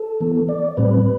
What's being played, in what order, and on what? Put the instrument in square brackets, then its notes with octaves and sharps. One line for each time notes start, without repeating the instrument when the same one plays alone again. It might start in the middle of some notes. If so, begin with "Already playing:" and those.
Already playing: [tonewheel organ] A4
E3 B3
D5
A2 G3 C4 B4